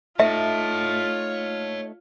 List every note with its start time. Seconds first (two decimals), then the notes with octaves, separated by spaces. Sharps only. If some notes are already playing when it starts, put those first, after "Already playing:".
0.20 A3 D#4 F4 C#5 E5 A5